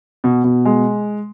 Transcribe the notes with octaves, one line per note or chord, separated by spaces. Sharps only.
B2
B2
G#3